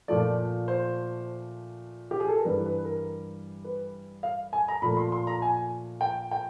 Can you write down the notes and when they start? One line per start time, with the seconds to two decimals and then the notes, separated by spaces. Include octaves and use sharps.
0.08 A#2 F3 A3 D5
0.68 C5
2.11 G4
2.20 G#4
2.29 A4
2.37 A#4
2.45 G2 E3 G3 B4
2.66 B4
2.85 A#4
3.64 B4
4.23 F5
4.53 G#5
4.68 A#5
4.82 A#2 F3 A3 B5
4.97 C6
5.12 C6
5.27 A#5
5.42 G#5
6.01 G5
6.31 G5